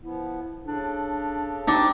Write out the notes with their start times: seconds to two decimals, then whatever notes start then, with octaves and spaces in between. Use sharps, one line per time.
0.02 F3 B3 E4
0.65 C#3 D4 A4
1.68 G3 C4 D4 D#4 G4